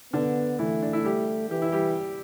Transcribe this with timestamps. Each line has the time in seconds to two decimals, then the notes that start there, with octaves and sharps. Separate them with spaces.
0.13 D3 B3 D4
0.59 E3 A3 E4
0.82 D4
0.93 E4
1.04 G3 G4
1.50 E3 G4
1.62 E4
1.72 G3 G4